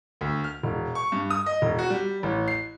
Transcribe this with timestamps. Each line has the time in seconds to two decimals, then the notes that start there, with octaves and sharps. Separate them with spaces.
0.21 D2
0.44 F6
0.63 E1
0.95 C#6
1.12 G2
1.30 D#6
1.46 D#5
1.62 E1
1.79 F#4
1.90 G3
2.23 A1
2.48 C7